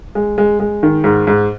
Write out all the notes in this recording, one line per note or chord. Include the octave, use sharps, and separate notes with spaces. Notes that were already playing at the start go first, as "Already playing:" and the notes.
G#3
G#3
G#3
D#3
G#2
G#2